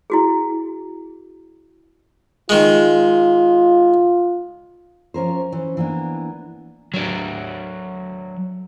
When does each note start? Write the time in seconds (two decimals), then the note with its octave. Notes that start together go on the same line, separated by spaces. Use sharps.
0.10 E4 F#4 G#4
2.49 D#3 G#3 F4
5.14 F3 C#4 A#4 C5
5.52 E3 C#4 C5
5.77 E3 A#3 B3 D4
6.94 F#3 D4